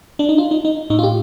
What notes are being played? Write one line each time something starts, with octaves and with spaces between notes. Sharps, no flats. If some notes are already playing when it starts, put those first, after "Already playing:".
D4
D#4
F4
D#4
D#4
A2 D#4
F4
G4